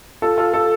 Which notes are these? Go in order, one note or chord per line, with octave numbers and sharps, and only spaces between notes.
F4 A4
F4 A4
F4 A4